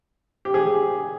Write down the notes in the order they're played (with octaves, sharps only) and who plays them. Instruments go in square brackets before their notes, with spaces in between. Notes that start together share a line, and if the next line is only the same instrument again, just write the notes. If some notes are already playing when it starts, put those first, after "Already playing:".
[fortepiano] G4
G#4